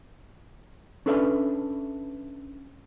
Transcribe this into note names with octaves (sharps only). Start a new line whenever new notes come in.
C#4 D4 A4 B4 E5